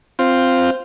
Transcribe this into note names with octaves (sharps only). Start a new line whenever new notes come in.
C4 F4 C5